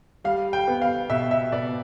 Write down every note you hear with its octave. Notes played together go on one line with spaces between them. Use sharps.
G3 F5
G5
B3
F5
B2 E5
E5
B2 D5